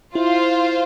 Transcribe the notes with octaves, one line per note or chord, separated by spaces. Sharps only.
E4 F4 C5 F5